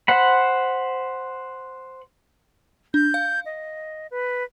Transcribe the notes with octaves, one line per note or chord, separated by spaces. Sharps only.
C5 F#5 B5
D4 G6
F5
D#5
B4